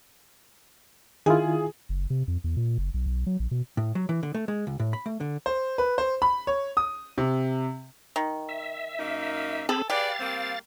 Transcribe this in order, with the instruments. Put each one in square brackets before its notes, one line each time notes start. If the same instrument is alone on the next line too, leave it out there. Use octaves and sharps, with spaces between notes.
[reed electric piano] D#3 E4 F4 [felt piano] G#4
[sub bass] F#1
C3
F2
E2
A#2
F#1
B1
B1
F#3
A#1
B2
[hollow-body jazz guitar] A2
F#3
E3
D3
A3
G#3
C#2
A2
B5
A3
D3
[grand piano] C5
B4
C5
B5
C#5
D#6
C3
[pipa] D#3
[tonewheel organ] E5
[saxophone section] F#2 A#3 D#4
[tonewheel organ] C4 G#4 B5 [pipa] A4
[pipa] G4 [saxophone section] G#4 B4 D5 [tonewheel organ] F5 A6
[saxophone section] G3 A#3 C4